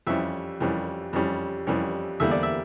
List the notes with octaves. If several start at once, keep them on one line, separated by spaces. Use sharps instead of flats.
F2 E3 G3 C#4 E5
F2 E3 G3 C#4
F2 E3 G3 C#4
F2 E3 G3 C#4
E2 D3 G3 A#3 E5
D5
E5